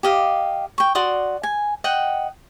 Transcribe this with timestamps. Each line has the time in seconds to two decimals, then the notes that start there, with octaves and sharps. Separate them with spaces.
0.03 G4 D#5 F5
0.78 G5 C#6
0.95 F#4 D5 C6 D#6
1.43 G#5
1.84 D#5 F#5 G5